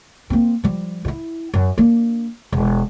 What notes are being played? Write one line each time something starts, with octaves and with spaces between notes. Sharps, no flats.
A#3 C4
F3 G3
G2 E4
F#2
A#3 D4
E1